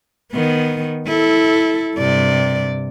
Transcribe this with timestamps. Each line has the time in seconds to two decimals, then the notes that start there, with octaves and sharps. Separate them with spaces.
0.32 D#3 B3
1.06 E4 A4
1.96 G2 C3 D5